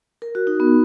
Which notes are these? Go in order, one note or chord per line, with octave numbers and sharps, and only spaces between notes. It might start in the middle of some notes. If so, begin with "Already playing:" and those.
A#4
F#4
D#4
B3